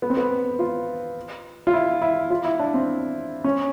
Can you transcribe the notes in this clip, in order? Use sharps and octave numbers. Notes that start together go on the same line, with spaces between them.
B3
C4
B3
F4
F4
E4
E4
F4
E4
D4
C4
C#4